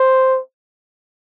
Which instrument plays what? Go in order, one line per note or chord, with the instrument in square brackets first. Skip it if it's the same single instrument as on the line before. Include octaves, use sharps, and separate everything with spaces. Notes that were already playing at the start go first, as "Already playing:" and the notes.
Already playing: [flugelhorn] C5